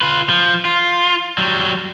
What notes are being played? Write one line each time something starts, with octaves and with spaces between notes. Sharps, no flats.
F4 B4
F3
F4
F#3 G3